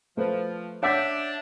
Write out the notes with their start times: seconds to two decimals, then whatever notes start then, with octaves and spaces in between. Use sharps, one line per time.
0.17 F3 A3 B4 C5
0.83 D4 C#5 E5 F#5 D6 G6